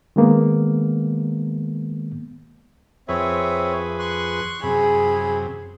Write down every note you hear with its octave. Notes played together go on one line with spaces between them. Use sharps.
D#3 G#3 A#3 B3
F2 C4 G#4 B4 C#5 E5
C6 C#6 F#6
F#2 C3 G#4 B5